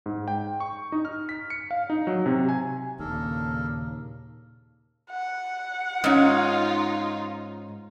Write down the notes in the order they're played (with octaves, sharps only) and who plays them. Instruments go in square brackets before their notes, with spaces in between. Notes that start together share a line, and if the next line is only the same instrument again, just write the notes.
[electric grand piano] G#2
G5
C#6
D#4
F6
B6
C#7
F5
D#4
F#3
C3
G#5
[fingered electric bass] D#2 [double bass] A#2 C#3 [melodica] D4 A4 A#4
[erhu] F#5
[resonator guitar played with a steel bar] G#2 C#4 [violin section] D#4 F4